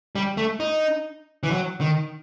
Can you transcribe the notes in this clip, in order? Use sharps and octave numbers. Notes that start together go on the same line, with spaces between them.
G3
A3
D#4
E3
F#3
D#3